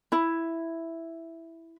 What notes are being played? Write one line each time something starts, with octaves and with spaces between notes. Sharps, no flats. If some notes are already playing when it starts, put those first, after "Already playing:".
E4 B5